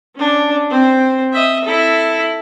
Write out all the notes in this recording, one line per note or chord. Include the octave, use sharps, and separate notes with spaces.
C#4 D4
C4 C5
D#5 E5
E4 A4